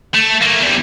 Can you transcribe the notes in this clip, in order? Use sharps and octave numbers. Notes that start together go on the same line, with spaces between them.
A3
A3 A#3
E2 G3